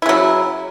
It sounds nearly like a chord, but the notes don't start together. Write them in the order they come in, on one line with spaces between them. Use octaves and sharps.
E4 C#3 F#3